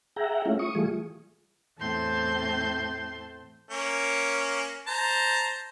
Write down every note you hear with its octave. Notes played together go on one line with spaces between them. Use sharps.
G#4 E5 F#5 G5 A#5
G#3 A3 C#4 E4 F4
C#6 D#6
E3 G3 A3 F4 G#4
E2 A2 C4 A5 C6 G6
A#3 C#4
C5 A5 A#5